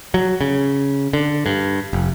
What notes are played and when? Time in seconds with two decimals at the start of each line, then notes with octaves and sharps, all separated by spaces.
0.14 F#3
0.41 C#3
1.13 D3
1.46 G2
1.93 F1